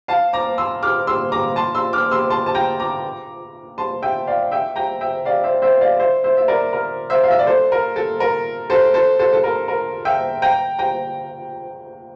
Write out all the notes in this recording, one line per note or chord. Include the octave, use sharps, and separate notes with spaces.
F5 A5
A#5 D6
C6 E6
D6 F6
C6 E6
A#5 D6
A5 C6
C6 E6
D6 F6
C6 E6
A5 C6
A5
G5 A#5
A#5 D6
A5 C6
E5 G5
D5 F5
E5 G5
G5 A#5
E5 G5
D5 F5
C5 E5
C5 E5
D5 F5
C5 E5
C5 E5
E5
A#4 D5
A#4
C5 E5
F5
E5
D5
A4 C5
A#4
A4
A#4
A4 C5
A4 C5
A4 C5
A4
A#4
A#4
E5 G5
G5 A#5
G5 A#5